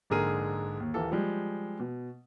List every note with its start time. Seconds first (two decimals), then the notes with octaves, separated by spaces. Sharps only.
0.10 A#1 G#2 D3 G#4 A#4 D#7
0.80 D#2
0.94 D#1 E3 A#3 A4
1.11 F3 G3 G#3
1.80 B2